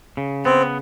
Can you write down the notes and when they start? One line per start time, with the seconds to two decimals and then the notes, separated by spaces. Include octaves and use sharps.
0.17 C#3
0.45 B3 C4